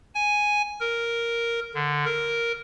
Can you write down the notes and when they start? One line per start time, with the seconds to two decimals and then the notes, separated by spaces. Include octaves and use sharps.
0.15 G#5
0.80 A#4
1.75 D3
2.05 A#4